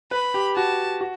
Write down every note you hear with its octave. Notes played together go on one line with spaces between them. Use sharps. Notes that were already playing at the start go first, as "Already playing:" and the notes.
B4 B5
G4
F#4 A5
F#4